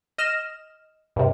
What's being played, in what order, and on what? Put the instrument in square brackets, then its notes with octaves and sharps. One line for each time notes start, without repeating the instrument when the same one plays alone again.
[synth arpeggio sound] D#5 F6 E7
G2 C3